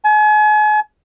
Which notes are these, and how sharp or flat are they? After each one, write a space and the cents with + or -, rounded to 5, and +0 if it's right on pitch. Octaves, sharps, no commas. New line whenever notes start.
G#5 +40